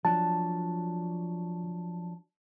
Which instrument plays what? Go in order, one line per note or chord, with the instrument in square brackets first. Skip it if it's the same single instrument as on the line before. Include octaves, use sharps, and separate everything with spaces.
[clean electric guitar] F3 F#3 D4 [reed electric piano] A5